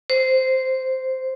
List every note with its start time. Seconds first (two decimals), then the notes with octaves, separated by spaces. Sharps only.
0.10 C5